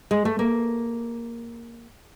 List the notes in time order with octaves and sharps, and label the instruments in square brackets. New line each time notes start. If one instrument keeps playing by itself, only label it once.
[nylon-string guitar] G#3
A3
A#3